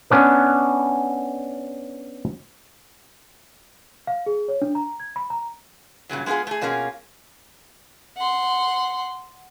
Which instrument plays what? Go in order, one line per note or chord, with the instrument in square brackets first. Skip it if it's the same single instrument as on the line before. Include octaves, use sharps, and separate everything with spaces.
[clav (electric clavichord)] B3 C#4 D4 B4
[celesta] F5
G#4
C#5
D4
A#5
G#6
B5
A#5
[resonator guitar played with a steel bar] G2 A#2 C#3 F#3
G#3 B3 D#4 F4 G#4
A3 G#4
B2 A#3 C#4 F4 G#4
[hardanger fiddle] F#5 C6